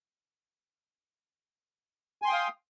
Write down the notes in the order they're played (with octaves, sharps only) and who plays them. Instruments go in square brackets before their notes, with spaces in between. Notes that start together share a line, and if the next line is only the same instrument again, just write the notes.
[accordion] G#5
C6
G5
D#6
F5